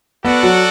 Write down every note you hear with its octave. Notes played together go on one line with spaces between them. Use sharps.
B3 F#4 A4 D5 F#5
F#3